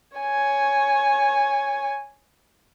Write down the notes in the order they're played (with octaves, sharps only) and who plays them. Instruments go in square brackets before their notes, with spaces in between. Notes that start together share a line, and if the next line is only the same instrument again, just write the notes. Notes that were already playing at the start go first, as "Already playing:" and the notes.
[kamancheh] C#5 G#5